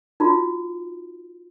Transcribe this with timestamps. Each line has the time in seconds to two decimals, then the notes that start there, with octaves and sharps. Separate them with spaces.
0.20 D#4 F4 F#4